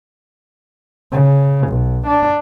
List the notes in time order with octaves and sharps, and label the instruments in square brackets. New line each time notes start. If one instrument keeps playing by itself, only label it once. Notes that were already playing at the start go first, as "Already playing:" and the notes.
[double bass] C#3
B1
D4